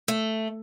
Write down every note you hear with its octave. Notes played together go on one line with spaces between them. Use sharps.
A3